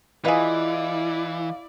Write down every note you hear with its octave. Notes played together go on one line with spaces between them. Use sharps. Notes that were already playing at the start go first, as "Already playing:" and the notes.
E3 E4 F4 G#4 B4 D5 D#5 F5